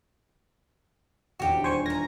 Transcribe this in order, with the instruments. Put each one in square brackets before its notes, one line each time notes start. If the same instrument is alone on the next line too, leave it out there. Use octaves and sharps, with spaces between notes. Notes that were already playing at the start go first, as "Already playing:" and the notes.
[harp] D#1 E2 D4 [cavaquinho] F#4 G4
[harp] G3 B4 [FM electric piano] C5 G#5 C#6
[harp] A#4 [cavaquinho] G#5 A#5 [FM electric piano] A#6